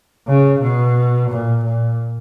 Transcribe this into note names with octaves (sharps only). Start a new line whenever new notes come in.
C#3
B2
A#2
A#2